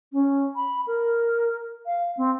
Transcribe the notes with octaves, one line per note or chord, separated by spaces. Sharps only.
C#4
B5
A#4
F5
C4